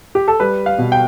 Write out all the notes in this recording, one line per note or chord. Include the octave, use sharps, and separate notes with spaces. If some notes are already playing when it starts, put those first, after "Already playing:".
G4
A4
G3 B4
F5
B2
G5